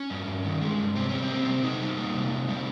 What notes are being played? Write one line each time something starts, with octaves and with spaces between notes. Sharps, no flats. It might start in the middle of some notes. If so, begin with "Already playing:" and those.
Already playing: C#4
G2
G2
D#3
G#3
G2
C3 C4
G3 C#4
C4
A#3
C3
C3 D#4
G3
A#3
C3
C3
G3